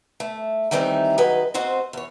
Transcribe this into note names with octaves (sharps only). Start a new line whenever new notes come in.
A3
D#3 E3 G3 A3 C4 D#4
D#3 F#3 G#4 B4 D#5
D2 C4 F#4 C5 D#5
E2 C#5